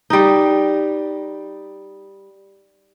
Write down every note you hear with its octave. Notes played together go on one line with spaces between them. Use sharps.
G3 D#4